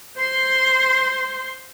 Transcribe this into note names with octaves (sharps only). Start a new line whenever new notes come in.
C5 C6